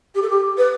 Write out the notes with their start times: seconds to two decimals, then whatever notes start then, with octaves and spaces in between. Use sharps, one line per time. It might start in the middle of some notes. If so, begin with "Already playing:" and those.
0.15 G4
0.22 A4
0.29 G4
0.57 B4